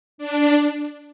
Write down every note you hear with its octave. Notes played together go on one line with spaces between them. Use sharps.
D4